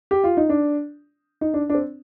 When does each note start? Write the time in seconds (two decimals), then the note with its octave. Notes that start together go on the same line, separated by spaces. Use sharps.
0.11 G4
0.24 F4
0.37 D#4
0.49 D4
1.41 D#4
1.54 D4
1.69 D4
1.74 C4